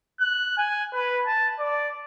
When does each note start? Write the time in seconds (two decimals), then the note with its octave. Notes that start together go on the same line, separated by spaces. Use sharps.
0.21 F#6
0.58 G#5
0.94 B4
1.27 A5
1.59 D5